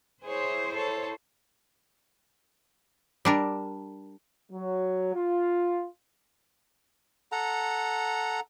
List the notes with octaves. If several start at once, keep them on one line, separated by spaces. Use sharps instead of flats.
E4 G#4 C5 C#5
A4 C#5
G3 D4 A#4
F#3
F4
A4 F#5 A#5